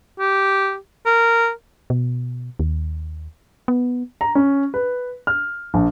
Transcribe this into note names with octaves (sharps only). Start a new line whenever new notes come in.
G4
A#4
B2
D#2
B3
A#5
C#4
B4
F6
A#1